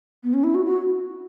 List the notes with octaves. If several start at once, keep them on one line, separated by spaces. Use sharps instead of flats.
B3
C#4
E4
F#4
F#4